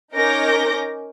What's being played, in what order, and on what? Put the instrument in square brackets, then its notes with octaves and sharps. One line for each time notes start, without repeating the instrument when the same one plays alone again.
[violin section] C#4 D#4 A#4 D6 G6 A#6